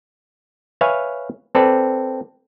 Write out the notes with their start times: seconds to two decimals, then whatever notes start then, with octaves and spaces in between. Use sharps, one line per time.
0.81 B4 C#5 E5 F5 G#5
1.55 C4 A4 B4 D5